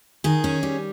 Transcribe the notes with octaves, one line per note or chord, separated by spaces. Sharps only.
D#3 G#4
C#4
G3